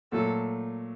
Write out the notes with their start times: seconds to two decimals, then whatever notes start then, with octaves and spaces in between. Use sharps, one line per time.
0.12 A#2 F#3 A3 A4